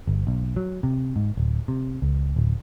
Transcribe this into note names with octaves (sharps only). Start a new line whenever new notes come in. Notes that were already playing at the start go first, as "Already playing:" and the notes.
G1
B1
F#3
C3
G#2
D1
C3
C#2
D1